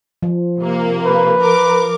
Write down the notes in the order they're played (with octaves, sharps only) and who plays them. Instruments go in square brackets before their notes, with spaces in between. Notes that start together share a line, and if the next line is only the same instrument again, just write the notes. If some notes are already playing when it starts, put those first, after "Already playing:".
[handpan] F3
[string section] C3 A#3
[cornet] B4
[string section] F3 A#4 D6